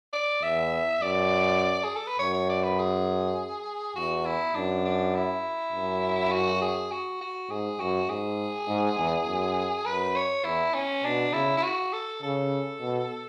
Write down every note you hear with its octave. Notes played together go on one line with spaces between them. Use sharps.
D5
E2 E5
F#2 D5
G#4
A4
B4
F#2 C#5
C#5
D5
B4
G#4
E2 F#4
E4
F#2 D4
D4
E4
F#2
F#4
G#4
F#4
F#4
G#2 G#4
F#2 F#4
G#2 G#4
G#2
E2
F#2
F#2 B4
C#5
E2 E4
C#4
B2 D4
C#3 E4
E4
F#4
A4
C#3 A4
B2